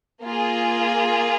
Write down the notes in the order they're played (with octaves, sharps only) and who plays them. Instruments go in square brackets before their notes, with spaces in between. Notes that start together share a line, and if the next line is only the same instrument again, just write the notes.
[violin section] A#3 F4 G#4